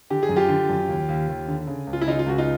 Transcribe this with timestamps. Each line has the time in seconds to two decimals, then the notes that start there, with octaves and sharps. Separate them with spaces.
0.10 D3 G4
0.23 G#4
0.29 F#2
0.36 F4 G4
0.49 D3
0.69 F#2
0.88 D#2
1.09 D#2
1.28 D#2
1.48 D3
1.67 C#3
1.87 C#2
1.93 F4
2.01 E4
2.06 C#3 D#4 F4
2.19 F4
2.26 C#2 F#4
2.38 D#4 F4